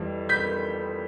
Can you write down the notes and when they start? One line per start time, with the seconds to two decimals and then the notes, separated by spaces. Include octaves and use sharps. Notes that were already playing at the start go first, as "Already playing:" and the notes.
Already playing: F2 E3 G3
0.29 G6 B6